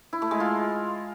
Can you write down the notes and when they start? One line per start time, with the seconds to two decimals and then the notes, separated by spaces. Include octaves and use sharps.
0.13 E4
0.22 A3
0.31 G#3
0.40 F4